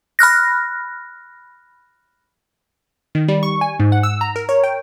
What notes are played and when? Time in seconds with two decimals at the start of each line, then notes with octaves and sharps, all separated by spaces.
0.19 B5 F6 F#6 A#6
3.15 D#3
3.28 G3
3.43 C#6
3.61 G#5
3.80 G#2
3.92 F#5
4.03 E6
4.21 A#5
4.36 A#4
4.49 C#5
4.64 G5